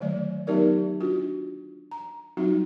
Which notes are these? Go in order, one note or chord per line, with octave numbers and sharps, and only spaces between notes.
D3 D#3 F#3 A3 D5
F#3 B3 D#4 G4 A#4 D5
D4 F4 F#4
A#5
F#3 G3 C4 D#4 F4 F#4